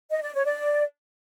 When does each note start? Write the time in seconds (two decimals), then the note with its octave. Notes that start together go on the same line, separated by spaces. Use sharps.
0.10 D#5
0.22 D5
0.34 C#5
0.45 D5